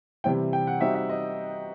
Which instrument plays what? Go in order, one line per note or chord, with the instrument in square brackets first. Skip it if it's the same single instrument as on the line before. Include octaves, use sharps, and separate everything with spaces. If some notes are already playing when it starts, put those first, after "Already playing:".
[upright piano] C3 E3 G3 C4 E4 [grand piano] G5
[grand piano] G5
F#5
[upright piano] G3 C4 D#4 F#4 [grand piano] E5
[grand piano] E5
D#5